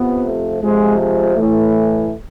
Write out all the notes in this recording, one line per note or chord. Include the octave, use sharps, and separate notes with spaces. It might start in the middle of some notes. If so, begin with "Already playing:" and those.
Already playing: F2 C3 F3 B3
A3
F2 C3 F3 G#3
G#3
A2 E3 A3